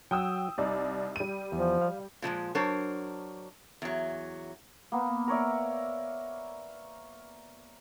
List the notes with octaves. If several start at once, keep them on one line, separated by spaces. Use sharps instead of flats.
F#3 G5 D#6 E6
C2 D#4 D5
G3 D#7
E2 F3
F5
A#2 F3 G3 G#3
F#3 D4 A#4 C5 C#5
E2 F#3
A#3 B3
A#4 C#5 D5 E5